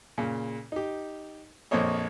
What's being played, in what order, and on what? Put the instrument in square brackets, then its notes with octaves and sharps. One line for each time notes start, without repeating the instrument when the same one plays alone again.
[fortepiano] A#2 C#3
D#4 G4
A#1 F2 A#3 C5 C#5 D#5